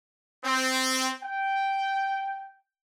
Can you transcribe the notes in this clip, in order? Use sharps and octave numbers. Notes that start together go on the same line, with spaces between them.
C4
G5